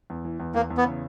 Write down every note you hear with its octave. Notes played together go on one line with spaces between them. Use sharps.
E2
E3
E2
E2 A#3
E2
B3
C#3